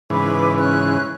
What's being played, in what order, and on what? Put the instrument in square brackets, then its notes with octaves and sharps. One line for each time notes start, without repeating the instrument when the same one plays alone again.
[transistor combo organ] G#2 C#3 E3 [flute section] B4 D6
[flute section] C#4 F#6